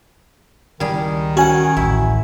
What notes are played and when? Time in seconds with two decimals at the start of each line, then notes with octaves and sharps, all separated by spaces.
0.80 C#2 D#3 G3 E4 G#4
1.37 C#4 F#4 F#5 G#5
1.77 A1 D2 E4